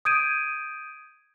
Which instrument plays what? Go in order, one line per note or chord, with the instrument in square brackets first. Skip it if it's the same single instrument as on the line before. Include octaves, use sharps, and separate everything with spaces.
[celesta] D#6 G6 G#6 D7 D#7